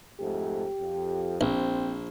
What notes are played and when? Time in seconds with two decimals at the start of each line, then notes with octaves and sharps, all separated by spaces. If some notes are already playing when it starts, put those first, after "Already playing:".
0.20 F2 G#2 A3 G4
0.80 F2
1.41 A#1 C4